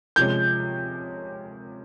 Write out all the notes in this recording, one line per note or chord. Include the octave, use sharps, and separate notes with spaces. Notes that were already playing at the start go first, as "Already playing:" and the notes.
C3 F3 G#3 C#4 G6